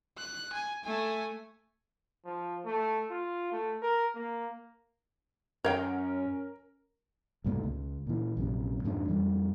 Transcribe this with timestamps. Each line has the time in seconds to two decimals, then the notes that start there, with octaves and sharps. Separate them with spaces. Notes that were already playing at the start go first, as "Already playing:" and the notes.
0.18 F#6
0.53 G#5
0.84 A3 G#5
2.25 F3
2.65 A3
3.11 F4
3.52 A3
3.82 A#4
4.15 A#3
5.64 F#2 C#4 A#4 C#5 F5 G5
7.44 C2 G#2 B2 A3
7.63 C#2
8.07 A#2 E3
8.37 A#1 F#2 C3
8.84 F2 G#2 B2 D4
9.08 F2 E3 G3